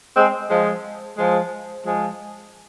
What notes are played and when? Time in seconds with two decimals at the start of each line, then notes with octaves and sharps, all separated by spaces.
0.16 G#3 C4
0.50 F3 G#3
1.18 F3 G#3
1.86 F3 G#3